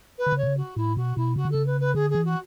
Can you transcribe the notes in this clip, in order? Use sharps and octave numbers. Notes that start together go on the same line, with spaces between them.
B4
D3
C#3 C#5
B2
C#3
F#4
A2 E4
B2 F#4
B2 E4
C#3 F#4
D3
C#3 A4
B4
B4
D3 G#4
E3 G#4
F#4